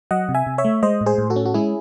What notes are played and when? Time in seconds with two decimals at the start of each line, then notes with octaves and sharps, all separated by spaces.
0.11 F#3 D#5 F#5
0.29 C3
0.34 E5 G#5
0.47 C3
0.58 C#5 E5
0.65 A3
0.83 G#3 C5 D#5
1.01 A2
1.06 G#4 C5
1.18 A2
1.30 F#4 A4
1.36 C#4
1.46 F#4
1.54 G#3 E4 G#4